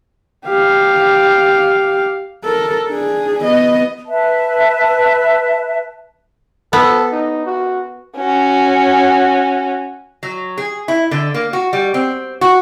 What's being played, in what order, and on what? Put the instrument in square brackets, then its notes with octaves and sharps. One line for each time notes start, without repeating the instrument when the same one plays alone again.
[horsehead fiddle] G4 F5
A4 A#4
D4 G#4
B3 D#5
[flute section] B4 E5 A5
[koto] B3 [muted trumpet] A4
[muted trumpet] D#4
F#4
[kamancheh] C#4 F#4
[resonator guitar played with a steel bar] F#3
G#4
E4
D3
A#3
F#4
G3
C4
F#4